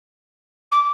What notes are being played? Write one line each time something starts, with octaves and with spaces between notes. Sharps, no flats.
D6